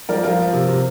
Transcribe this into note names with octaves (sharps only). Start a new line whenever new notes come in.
F3 A#4 D5
F3 F4 A#4
F3
C3
C3